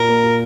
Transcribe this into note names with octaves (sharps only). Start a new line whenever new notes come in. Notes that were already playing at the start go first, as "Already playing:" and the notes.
Already playing: A#2 A#4
A#3
A#2